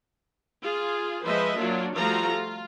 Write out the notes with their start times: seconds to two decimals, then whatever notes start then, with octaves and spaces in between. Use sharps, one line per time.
0.64 F4 G#4
1.25 F3 G#3 B4 C5 D#5 E5
1.59 F#3 A#3 D4 F4 F#4
1.97 F3 G3 A3 F4 F#4 A#5
2.33 F4